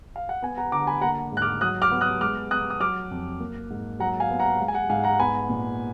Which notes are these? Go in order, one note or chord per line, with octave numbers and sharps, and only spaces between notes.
F5
F#5
B3 G#5
F#5 A#5
D3 A#5 D6
G#5 B5
A#3 F#5 A#5
G#2
F#6
D6 F6
F#3 D#6 F#6
D6 F6
B3
D#6 F#6
G#3 D6 F6
B3 D#6 F#6
D#6
F#3 D6 F6
F2
A#3
G#2
F#3 F#5 A#5
F5 G#5
B3
F#5 A#5
G#3 F5
G#5
F#5
G#2 F5 G#5
F#5 A#5
B3 G#5 B5
A#2